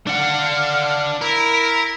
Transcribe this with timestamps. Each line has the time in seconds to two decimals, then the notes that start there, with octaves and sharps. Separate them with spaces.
0.07 D4 F5 F#5
1.22 E4 A#4